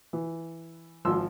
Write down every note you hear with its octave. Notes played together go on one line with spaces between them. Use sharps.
E3
G#1 F3 C6 E6